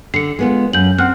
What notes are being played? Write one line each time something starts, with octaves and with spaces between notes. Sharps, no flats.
D3 C7 C#7
G#3 B3 F4
F#2 G6 F#7
C4 F#5 F6 F#6